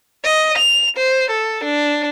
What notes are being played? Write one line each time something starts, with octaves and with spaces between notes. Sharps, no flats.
D#5
F7
C5
A4
D4